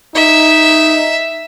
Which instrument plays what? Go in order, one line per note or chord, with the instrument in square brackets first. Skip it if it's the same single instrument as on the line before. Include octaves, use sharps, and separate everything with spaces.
[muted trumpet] D#4 [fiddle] E5